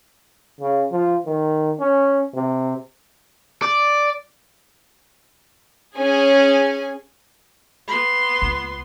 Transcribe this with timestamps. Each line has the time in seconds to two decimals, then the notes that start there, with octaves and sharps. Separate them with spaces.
0.61 C#3
0.92 F3
1.26 D#3
1.80 C#4
2.35 C3
3.62 D5
5.96 C#4 G#4 G#5
7.88 B3 C6
8.42 C#2